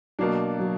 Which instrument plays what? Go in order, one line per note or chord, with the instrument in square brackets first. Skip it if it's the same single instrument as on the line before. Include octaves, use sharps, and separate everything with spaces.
[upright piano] B2 A#3 D4 [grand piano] F#3
[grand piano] F#3